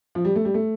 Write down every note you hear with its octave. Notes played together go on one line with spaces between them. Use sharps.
F3
G3
A3
G3
A3